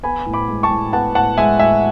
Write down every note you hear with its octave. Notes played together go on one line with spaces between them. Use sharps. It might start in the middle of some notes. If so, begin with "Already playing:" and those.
B3 G#5 B5
A2
B5 D6
G#3
A5 C#6
A2
B3 F#5 A5
A2 F#5 A5
G#3 E5 G#5
A2 E5 G#5